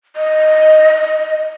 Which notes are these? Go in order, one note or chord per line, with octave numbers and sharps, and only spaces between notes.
D#5